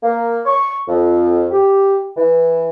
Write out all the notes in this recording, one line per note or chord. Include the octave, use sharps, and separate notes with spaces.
A#3
C#6
F2
G4
E3